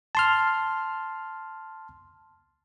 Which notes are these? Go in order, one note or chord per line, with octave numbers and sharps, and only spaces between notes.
A5 C6 F6